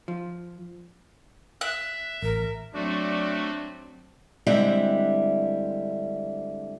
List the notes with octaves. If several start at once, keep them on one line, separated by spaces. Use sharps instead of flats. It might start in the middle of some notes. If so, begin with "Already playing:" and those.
F3
E5 F#6
A1 A#4
F#3 A3 C4 D4 F#4
D3 G3 G#3 C4 E4 E5